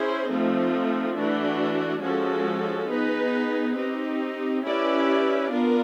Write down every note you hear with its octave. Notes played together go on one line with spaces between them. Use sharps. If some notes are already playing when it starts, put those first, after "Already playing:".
Already playing: C#4 E4 G#4 C5
F3 A3 C4 D#4
E3 A3 D4 F#4
F3 G#3 C#4 F#4 A4
B3 D#4 G#4 B4
C4 D#4 G4
C#4 E4 G4 B4 D5
B3 D4 F4 A#4